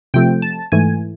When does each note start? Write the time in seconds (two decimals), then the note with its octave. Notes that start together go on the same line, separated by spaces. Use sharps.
0.14 C3 F3 A3 C4 G5
0.42 A5
0.72 G#2 E3 A3 G#5